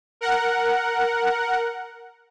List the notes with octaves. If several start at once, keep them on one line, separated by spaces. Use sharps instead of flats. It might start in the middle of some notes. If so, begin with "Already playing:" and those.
A#4 F#5